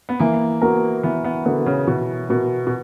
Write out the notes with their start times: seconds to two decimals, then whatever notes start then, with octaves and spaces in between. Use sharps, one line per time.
0.09 B3
0.20 E3 A#3
0.62 B3 F#4 A#4
1.03 E3 B3
1.24 B3
1.45 D3 B3 F#4 A#4
1.66 C#3
1.87 B2 E3
2.29 B2 B3 F#4 A#4
2.67 B2